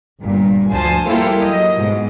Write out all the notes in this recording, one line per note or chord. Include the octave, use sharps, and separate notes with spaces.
G1 G2 A#2
D2 F3 C5 G#5 A5
G3 A#3 E4 F4 G4 A4
F#3 D#5
G#2 B2